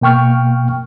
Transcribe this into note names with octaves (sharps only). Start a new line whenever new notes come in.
B2 A#3 G5 C#6 F6